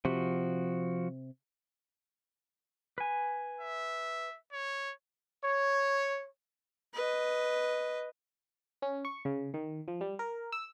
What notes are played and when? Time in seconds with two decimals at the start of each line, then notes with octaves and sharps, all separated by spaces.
0.05 C3 F3 F#4
2.98 B4 G#5
3.61 E5
4.52 C#5
5.43 C#5
6.94 B4 D#5
8.82 C#4
9.05 C#6
9.25 C#3
9.54 D#3
9.88 F3
10.01 G3
10.19 A#4
10.52 E6